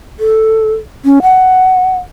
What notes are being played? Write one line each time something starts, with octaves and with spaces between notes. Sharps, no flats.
A4
C#4
F#5